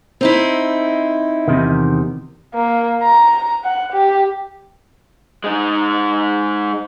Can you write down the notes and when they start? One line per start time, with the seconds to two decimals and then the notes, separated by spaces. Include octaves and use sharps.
0.21 C4 D#4 E4
1.48 E2 C3 D#3
2.54 A#3
3.02 A#5
3.64 F#5
3.93 G4
5.44 G#3 D#4